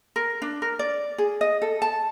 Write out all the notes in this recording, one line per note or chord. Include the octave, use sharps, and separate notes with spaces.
A#4
D4
A#4
D5
G#4
D#5
A4
A5